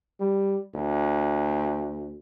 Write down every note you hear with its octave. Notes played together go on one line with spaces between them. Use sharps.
G3
D2